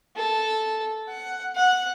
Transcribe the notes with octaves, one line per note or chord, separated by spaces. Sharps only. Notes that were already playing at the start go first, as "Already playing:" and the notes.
A4
F#5
F#5